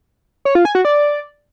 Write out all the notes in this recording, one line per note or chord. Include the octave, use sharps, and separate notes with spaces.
C#5
F4
G#5
F#4
D5